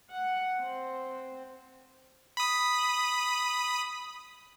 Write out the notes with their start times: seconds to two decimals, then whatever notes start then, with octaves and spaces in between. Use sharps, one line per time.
0.11 F#5
0.60 C4
2.37 B5 D#6